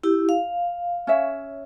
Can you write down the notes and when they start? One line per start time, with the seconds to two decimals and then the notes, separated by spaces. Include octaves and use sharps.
0.03 E4 G4
0.29 F5
1.07 C#4 C#5 E5